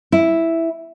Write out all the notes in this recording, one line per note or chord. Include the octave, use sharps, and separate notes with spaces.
E4